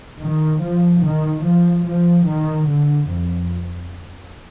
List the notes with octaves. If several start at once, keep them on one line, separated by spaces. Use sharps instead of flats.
D#3
F3
D#3
F3
F3
D#3
D3
F2